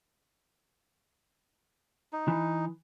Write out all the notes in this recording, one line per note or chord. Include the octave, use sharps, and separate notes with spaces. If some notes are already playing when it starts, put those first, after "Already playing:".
D#4
E3